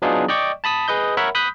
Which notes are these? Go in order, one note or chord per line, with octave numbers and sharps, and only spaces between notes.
F#3 B3 D4 D#4 F4 G#4
D5 D#5 G5 C#6 D6
A5 B5 D#6 B6
G#4 B4 D#5 G6
A#4 C#5 E5 F#5 B5
B5 D#6 F#6 G6 B6